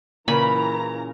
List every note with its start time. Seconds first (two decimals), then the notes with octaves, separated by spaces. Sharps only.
0.28 A#2 C#3 E3 C#4 A#4 A#5 B5